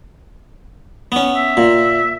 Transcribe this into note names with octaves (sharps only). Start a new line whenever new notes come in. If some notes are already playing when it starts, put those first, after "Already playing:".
B3 C#4
E5
A#2